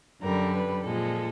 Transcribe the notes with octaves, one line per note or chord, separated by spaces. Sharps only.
F#2 D3 G3 A#4
B4
A#2 F3 G#3 A4